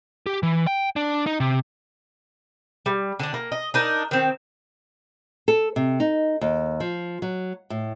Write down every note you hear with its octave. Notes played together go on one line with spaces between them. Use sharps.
G4
E3
G5
D4
D#4
C3
G3
D3 D4
A#3
D#5
D4 D#4 A#4
D#3 C4
A4
C3
D#4
D#2
F3
F#3
A2